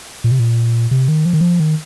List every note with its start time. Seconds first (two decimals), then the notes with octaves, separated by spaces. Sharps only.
0.24 A#2
0.31 C3
0.39 A#2
0.91 C3
1.08 D#3
1.26 F3
1.33 D#3
1.40 F3
1.60 D#3